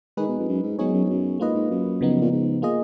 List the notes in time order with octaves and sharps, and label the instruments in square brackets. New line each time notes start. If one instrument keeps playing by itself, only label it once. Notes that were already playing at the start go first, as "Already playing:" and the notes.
[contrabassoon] D#3 [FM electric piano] G#3 D#4 G#4 B4
[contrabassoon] B2
F2
F#2
G#2
[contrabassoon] G#2 [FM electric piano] F#3 B3 D#4 G#4 C#5
[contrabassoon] F#2
G#2
F#2
[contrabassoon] G#2 [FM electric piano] A#3 F4 B4 D#5
[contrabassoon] G#2
F#2
[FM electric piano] C#3 F3 B3 D#4
[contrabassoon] A#2
G#2
[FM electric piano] A#3 F4 G#4 D#5